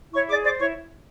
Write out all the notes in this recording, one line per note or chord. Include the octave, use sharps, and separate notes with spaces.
E4 C#5 C#6
G#4 D5 D6
C5 D5 D6
E4 C#5 C#6